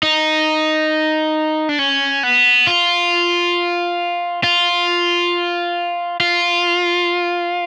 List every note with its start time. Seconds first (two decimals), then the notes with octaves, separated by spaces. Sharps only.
0.03 D#4
1.69 D4
1.79 C#4
2.23 B3
2.67 F4
4.44 F4
6.20 F4